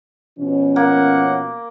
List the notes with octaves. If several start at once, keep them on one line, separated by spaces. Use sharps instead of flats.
B2 F3 C#4
A#3 F#5